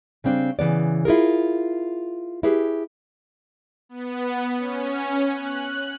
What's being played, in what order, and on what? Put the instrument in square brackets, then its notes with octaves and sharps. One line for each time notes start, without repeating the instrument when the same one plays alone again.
[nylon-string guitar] C#3 G3 C4 D4
C#3 E3 B3 D5
E4 F4 G#4 A#4
E4 G4 G#4 B4
[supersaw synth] B3
C#4
F#6